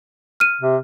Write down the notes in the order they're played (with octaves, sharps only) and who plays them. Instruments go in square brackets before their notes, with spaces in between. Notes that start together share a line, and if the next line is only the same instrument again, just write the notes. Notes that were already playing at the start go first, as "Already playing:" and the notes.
[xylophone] F6 D#7
[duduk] C3